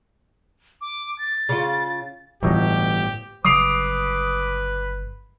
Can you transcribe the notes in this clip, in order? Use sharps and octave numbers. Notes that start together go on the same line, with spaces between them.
D6
A6
C#3 F4
G1 A2 E3 F#3 A3 D#4 G4
G1 C#3 F#3 B4 D6 D#6 C7 F7